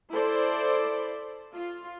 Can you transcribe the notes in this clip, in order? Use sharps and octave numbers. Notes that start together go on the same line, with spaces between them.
E4 A4 C5 D5
F4